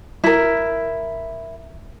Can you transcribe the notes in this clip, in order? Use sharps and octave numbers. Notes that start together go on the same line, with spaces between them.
E4 A#4